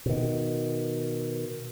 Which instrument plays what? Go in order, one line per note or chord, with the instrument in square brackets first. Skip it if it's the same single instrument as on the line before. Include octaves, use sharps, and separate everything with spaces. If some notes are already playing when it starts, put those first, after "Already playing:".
[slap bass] B2 D#3